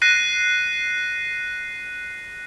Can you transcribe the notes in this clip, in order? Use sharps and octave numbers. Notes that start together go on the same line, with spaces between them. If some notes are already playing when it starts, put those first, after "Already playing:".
F#6 A#6 C7 D#7